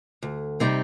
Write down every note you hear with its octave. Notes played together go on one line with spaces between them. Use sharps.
D2
C3 G3 C4 D#4